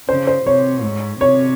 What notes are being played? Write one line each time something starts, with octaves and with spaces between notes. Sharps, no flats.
C#3 C5
C5
C3 C#5
G#2
C3 C#5